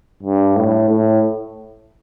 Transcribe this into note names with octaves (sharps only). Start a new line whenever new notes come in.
G2
A2
A2